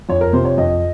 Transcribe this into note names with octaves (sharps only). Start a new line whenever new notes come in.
F2 C#5
A#4
C3 F3 C5
C#5
F2 D#5